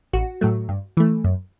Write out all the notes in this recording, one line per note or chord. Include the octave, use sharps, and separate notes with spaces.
A1 F#4
A2 F#3 A3
G2
E3 A3
F#2